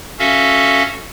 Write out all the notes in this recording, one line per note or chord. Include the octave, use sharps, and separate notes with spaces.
C#4 F#4 A4 E5 F5